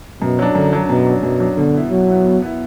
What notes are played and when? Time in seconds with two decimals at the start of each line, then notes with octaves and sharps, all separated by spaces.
0.22 F#2 B2
0.39 F#3 D4
0.55 F#2 D3
0.73 F#3 D4
0.90 F#2 B2
1.06 F#3 D4
1.23 F#2 B2
1.40 F#3 D4
1.57 B2 D3
1.74 B3 E4
1.91 B2 F#3
2.08 B3 E4
2.25 B2
2.42 B3 E4